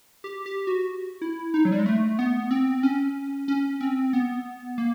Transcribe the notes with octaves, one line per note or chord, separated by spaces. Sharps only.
G4
G4
F#4
E4
D#4
F#3
G3
G#3
A3
B3
C4
C#4
C#4
C4
B3
A#3